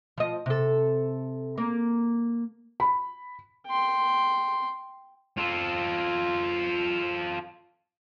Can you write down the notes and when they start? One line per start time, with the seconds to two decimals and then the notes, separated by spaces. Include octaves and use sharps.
0.18 F3 D#5
0.46 C3 A4
1.58 A#3
2.80 B5
3.67 G5 C6
5.38 F4 A4